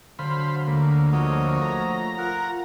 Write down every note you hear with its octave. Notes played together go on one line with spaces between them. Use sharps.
D3 F#3 C5 F5 B5
D2 A#3
F3 A3 F#4 C#5 D#5
A#5
F4 A#4 F#5